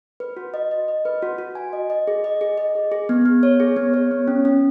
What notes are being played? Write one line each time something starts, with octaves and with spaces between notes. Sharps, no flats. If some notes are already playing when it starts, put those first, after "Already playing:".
B4
F#4
D#5
D#5
D#5
B4
F#4
F#4
G#5
D#5
D#5
G#4
D#5
G#4
D#5
G#4
G#4
B3
B3
C#5
G#4
B3
C#5
B3
C#4
C#4